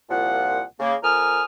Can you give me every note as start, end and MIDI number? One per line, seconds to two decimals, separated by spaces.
0.10 0.62 36
0.10 0.62 46
0.10 0.62 53
0.10 0.62 78
0.80 0.95 49
0.80 0.95 58
1.02 1.43 41
1.02 1.43 70
1.02 1.43 80
1.02 1.43 87
1.02 1.43 89